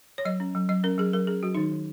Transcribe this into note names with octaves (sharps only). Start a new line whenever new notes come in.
C#5
F#3 D#5
C#4
F#3
F#3 D#5
C#4 A#4
F#3 G#4
F#3 A#4
C#4 G#4
F#3 F#4
D#3 D#4
D#3